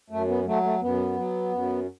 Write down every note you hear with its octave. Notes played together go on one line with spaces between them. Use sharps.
F#2 A3
B3
F#3 A3
A3
F#2 B3
F#3
F#2